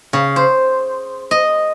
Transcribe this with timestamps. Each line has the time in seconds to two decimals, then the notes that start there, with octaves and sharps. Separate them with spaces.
0.13 C#3
0.36 C5
1.31 D#5